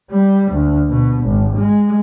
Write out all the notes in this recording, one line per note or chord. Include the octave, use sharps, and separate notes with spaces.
G3
D2
B2
G#1
G#3